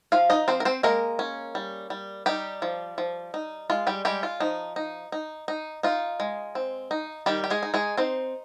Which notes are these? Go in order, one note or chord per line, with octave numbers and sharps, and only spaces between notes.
F3 F4 F5
D#4 D#5
F3 C4 C5
A#4
C4 C5
G#3 A#3 A#4
C#4
G3
G3
G3 D#4 G4
F3
F3
D#4
G#3 F4
G3 G4
G3 G#3 G4
F4
F3 D#4
D#4
D#4
D#4
D#4 F4
G#3
C4
D#4
D#3 G3 G4
G4
G#3 G#4
D#4
G#3 G#4
C4 D#4 C5